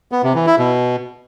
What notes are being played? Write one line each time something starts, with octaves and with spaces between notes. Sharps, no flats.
B3
C3
E3
E4
B2